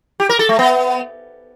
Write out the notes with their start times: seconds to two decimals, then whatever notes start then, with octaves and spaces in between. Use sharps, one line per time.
0.20 G4
0.29 A#4
0.39 A4
0.49 A3
0.59 B3